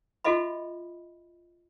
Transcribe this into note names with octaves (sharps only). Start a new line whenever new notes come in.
F4 F#4 A4 D#5 E5 B5